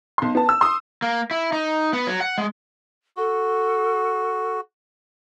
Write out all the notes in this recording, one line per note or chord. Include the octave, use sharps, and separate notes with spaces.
B1 C6
B3 A5
E6
C6 D#6
A#3
E4
D#4
B3
F#3
F#5
G#3
F#4 A4